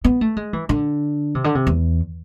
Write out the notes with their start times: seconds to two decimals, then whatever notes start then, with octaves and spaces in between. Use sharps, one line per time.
0.04 B3
0.21 A3
0.37 G#3
0.53 E3
0.69 D3
1.35 C3
1.44 D3
1.55 C3
1.67 E2